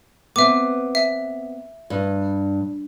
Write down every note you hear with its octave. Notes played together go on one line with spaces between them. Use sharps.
B3 C4 E5 D6
E5
G2